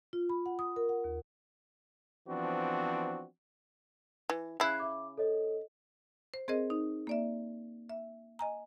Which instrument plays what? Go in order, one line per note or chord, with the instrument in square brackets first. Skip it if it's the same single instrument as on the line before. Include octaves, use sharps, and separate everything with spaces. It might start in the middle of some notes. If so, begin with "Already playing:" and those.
[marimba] F4
B5
F#5
D#6
A#4
F#5
D#2
[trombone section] E3 F3 B3 C4 D4 F#4
[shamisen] E3
[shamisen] C#3 E4 [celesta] F#6 G#6 C7
[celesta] E5 D6
A4 C#5 D#5
[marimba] C5
C4 G#4 A#4 C5 D#5
D#4
A#3 D5 E5
E5
D#5 G#5 A#5